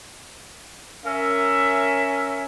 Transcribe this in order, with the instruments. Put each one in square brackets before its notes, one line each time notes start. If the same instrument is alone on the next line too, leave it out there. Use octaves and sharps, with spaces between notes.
[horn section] C#4 A#4 E5